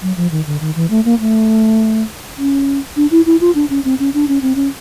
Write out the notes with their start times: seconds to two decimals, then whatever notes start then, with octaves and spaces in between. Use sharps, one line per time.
0.02 F#3
0.17 F3
0.31 D#3
0.47 D3
0.61 D#3
0.76 E3
0.90 A3
1.05 A#3
1.20 A3
2.37 C#4
2.96 D4
3.11 E4
3.26 E4
3.41 F4
3.55 D4
3.70 C#4
3.85 C4
4.00 C#4
4.14 D4
4.28 C#4
4.42 C4
4.56 C#4